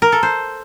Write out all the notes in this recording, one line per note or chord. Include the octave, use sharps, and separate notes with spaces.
A#4
A4
C5